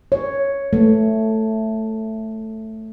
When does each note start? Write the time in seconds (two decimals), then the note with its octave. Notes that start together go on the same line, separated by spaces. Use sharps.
0.12 C#5
0.73 A3